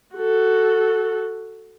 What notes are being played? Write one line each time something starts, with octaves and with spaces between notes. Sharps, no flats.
F#4 A4